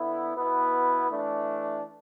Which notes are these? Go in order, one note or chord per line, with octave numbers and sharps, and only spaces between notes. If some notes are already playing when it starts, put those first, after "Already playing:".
Already playing: D3 B3 E4
B2 B3 E4 B4
E3 A3 D4